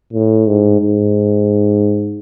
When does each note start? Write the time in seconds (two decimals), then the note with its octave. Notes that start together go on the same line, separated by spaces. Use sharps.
0.13 A2
0.47 G#2
0.80 G#2